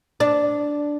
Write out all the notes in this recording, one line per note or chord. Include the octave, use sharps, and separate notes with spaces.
D4